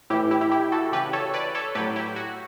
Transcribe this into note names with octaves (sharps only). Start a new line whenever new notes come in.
A2 E3 E4 G4
E4 G4
E4 G4
E4 G4
F#4 A4
C#3 E3 G4 B4
A4 C#5
B4 D5
A4 C#5
A2 F#3 G4 B4
E4 G4
F#4